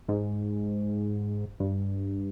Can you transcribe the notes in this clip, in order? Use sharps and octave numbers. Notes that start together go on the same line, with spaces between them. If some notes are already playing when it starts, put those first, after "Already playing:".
G#2
G2